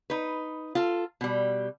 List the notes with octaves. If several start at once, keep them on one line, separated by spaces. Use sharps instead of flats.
D#4 B4
F4 A4
B2 G3